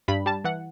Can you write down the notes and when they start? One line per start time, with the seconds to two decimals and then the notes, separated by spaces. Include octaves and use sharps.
0.08 G2 B5
0.26 G3 A5
0.45 E3 F#5